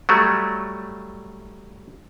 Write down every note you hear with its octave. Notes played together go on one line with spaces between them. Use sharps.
F#3 G3 A3